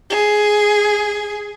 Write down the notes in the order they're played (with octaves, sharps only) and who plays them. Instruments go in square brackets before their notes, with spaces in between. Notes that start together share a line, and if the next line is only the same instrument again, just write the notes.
[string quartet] G#4